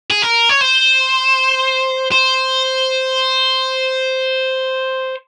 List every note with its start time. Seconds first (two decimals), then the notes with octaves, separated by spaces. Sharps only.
0.11 G#4
0.22 A#4
0.49 C#5
0.61 C5
2.12 C5